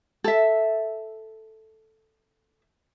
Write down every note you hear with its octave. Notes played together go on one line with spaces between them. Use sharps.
A4 E5